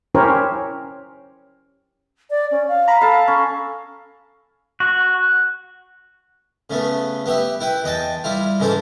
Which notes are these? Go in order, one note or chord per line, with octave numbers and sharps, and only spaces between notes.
C#4 E4 G4 A#4 C5 C#5
D5
C#4
F5
A#5 B5
A4 F5 A5
C#4
F#4
C#3 A3 B3
B3 G4 E5
E4 B4 G5
E2 D#5 G5 A5
G3 E4 F4
G#2 C#3 E3 A4 C5 A5